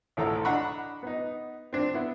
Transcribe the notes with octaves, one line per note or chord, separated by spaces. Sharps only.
G#1 D2 A2 A4 A#5
D4 D#5 F#5 A#5 B5 C#6
B3 D#4
C4 D4
B3 E4